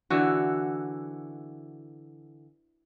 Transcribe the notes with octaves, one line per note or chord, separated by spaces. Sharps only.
D3 E3 F#4